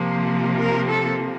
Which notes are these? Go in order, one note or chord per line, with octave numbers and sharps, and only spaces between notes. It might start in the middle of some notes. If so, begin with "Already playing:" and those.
Already playing: C3 F3 A#3
A#4
A4